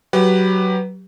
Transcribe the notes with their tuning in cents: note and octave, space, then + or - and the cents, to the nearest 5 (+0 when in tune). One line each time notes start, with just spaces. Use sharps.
F#3 +20 G4 +15 B4 +0